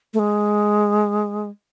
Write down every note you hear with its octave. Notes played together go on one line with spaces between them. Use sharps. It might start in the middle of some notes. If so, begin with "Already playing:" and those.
A3
G#3